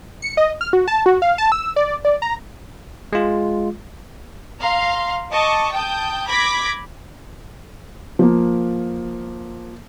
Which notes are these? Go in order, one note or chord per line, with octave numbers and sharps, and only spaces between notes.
C#7
D#5
F6
F#4
A5
F#4
F5
A5
E6
D5
D5
A#5
G#3 F4
F5 A#5 C6
D#5 A5 C#6 D6
G5 A5 D#6 G6
B5 D6 G#6 A#6 B6
F3 A#3